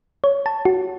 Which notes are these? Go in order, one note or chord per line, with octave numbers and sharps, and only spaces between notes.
C#5
A5
F#4